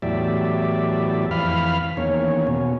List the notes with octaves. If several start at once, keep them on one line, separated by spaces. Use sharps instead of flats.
E2 A2 F#3 G4 D5 E5
F2 E3 F5 B5 F6
E2 D#3 A#3 C#4 C#5
B2 C#4